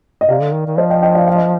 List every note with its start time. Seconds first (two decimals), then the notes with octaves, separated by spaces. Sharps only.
0.21 D#5
0.28 C3 D5 F5
0.41 D3
0.53 D#3
0.66 D#3
0.78 F3 C5 D#5
0.90 D#5 G5
1.02 D#5 G5
1.15 D5 F5
1.28 F5
1.35 D#5